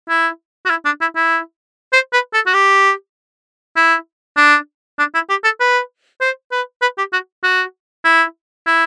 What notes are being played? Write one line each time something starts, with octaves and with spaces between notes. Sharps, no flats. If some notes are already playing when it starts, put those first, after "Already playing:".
E4
F#4
E4
D4
E4
E4
C5
B4
A4
F#4
G4
E4
D4
D4
E4
G4
A4
B4
C5
B4
B4
G4
F#4
F#4
E4
E4